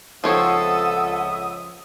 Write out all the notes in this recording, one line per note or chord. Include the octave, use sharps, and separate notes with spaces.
C#2 F3 C4 A4 C#5 E5 F#5 D#6